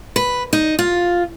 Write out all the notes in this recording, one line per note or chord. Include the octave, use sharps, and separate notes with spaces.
B4
D#4
F4